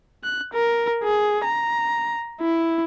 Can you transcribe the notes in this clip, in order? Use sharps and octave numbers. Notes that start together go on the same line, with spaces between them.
F#6
A#4
G#4
A#5
E4